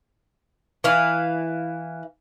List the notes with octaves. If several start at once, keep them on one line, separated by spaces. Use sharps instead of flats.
E3 F5